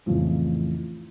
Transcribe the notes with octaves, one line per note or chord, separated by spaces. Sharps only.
F2 A2 C#3 E3